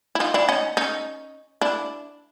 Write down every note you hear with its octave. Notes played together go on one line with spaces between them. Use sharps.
E4
D#4 F4
D4 E4
C#4 D#4
C#4 D#4
D4 E4